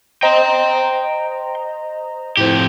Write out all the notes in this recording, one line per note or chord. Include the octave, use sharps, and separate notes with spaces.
C5 D#5 G5 A#5 C6
F2 A2 G4 C5